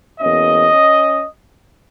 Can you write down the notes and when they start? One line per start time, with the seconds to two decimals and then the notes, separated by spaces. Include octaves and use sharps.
0.20 E2 B2 A#3 C#4 D#5
0.71 C#4